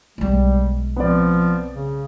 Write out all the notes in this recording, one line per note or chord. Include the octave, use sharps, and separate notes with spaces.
B1 G3 G#3
F3 B3 C4 D5
C#3